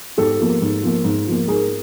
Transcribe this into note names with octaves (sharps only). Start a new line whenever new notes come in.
G#2 G4 A4
F3 A#3
G#2
F3 A#3
G#2
F3 A#3
G#2 G#4 A#4